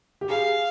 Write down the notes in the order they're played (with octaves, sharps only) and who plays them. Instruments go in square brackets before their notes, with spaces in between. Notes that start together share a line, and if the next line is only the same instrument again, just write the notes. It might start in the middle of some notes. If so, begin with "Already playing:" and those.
[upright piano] G4
[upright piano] G#4 [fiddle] F5